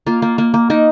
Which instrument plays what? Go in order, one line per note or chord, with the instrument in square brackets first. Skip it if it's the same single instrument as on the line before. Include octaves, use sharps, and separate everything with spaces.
[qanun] A#3 F4
A#3
A#3
A#3
A#3 D#4